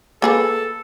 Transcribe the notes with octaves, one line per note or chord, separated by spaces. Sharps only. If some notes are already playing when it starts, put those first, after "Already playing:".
A#3 G#4 A4 B4